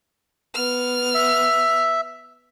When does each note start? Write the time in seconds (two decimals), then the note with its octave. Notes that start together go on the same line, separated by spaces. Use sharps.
0.55 B3 F6
1.14 E5